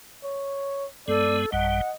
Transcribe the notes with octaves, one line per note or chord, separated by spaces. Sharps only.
C#5
G2 G#3 B3 A4 D5
A1 F#2 G3 D#5 F#5